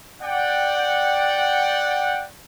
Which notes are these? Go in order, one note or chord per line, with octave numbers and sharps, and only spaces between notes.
D5 F#5 G5